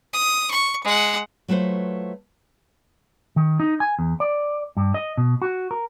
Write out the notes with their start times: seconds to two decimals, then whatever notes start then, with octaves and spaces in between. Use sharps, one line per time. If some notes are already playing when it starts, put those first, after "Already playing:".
0.13 D#6
0.51 C#6
0.84 G#3 F#5
1.48 F#3 A3 F4 B4 C5
3.36 D#3
3.60 D#4
3.80 G#5
3.99 E2
4.20 D5
4.77 G2
4.94 D#5
5.17 B2
5.42 F#4
5.71 A#4